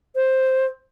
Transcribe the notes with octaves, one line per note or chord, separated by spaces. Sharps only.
C5